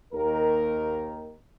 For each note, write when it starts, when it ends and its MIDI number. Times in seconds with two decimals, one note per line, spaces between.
0.14 1.37 39
0.14 1.37 51
0.14 1.37 70